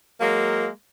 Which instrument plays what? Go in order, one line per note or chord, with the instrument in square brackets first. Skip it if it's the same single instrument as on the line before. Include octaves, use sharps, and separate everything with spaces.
[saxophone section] F#3 G#3 A#3